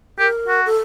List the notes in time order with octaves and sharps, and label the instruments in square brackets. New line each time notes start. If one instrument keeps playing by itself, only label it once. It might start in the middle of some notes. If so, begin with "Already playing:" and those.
[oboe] G4 [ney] A#4
[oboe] F#4
[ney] A4